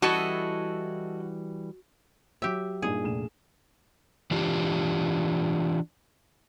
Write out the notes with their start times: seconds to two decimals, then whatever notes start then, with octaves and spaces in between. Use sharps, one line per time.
0.02 E3 G3 E4 F#4 A4 D#5
2.42 F#3 G4 E5
2.82 G2 A#2 D#4 G#4
3.03 F1 A#1 E7
4.31 E3 D4 F4 G4